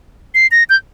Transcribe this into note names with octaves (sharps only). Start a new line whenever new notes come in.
C7
A#6
G6